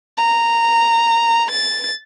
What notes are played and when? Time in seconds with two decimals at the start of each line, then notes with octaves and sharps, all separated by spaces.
0.18 A#5
1.51 A6